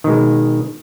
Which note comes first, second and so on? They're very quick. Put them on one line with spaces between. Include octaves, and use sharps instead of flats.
D#3 B2 G#3